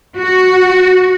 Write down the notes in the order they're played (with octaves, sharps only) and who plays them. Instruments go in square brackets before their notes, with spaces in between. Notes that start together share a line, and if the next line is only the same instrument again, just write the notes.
[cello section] F#4